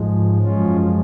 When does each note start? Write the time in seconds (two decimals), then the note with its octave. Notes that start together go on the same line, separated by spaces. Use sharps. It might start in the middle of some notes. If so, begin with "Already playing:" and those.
Already playing: G#2 F3 G#3
0.41 F#2 F3 G#3 C#4 F4